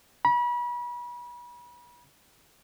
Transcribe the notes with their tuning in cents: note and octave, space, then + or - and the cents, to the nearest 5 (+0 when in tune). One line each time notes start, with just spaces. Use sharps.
B5 -35